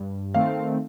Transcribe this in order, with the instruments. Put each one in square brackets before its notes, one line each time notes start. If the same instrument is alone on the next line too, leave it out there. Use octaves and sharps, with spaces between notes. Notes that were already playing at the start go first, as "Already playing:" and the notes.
Already playing: [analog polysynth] G2
[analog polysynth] D#3 A3 C4 [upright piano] F5